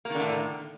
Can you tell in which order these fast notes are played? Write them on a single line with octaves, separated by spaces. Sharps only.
A#3 D#3 D3 A2